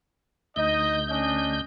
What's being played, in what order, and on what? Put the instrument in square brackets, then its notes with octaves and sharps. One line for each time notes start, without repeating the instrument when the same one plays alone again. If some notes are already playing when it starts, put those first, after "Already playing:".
[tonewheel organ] D2 G6 [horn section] D#4 D#5
[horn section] C#4 D4 D#5